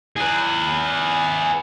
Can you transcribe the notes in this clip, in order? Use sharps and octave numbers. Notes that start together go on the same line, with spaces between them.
G#4 B4